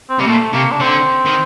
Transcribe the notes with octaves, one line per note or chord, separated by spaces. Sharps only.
C4
C3 G3
A#2 A3
C3 A#3
D4
D3 C4
D#3